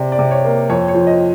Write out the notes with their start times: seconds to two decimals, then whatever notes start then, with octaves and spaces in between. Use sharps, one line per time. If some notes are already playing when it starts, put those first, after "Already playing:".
Already playing: C3 D5
0.12 D5
0.19 C3
0.31 C#5
0.44 A#3
0.70 F2 C#5
0.88 C#5
0.94 F3
1.07 D#5